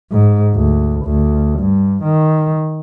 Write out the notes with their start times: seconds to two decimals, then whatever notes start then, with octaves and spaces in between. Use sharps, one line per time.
0.12 G#2
0.55 D2
1.05 D2
1.60 G2
2.03 D#3